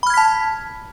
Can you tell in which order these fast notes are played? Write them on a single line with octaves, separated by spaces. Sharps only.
B5 F6 G#6 B6 A5